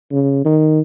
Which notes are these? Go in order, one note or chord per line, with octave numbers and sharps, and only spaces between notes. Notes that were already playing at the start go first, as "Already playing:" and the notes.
C#3
D#3